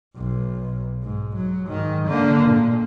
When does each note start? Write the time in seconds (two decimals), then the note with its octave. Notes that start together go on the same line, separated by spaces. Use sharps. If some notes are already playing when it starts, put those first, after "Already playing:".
0.16 B1
1.03 G#2
1.36 F#3
1.67 G#2 D#3
2.06 D3 A#3
2.50 A#2